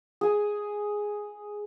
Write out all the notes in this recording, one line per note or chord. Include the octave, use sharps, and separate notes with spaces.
G#4 G#5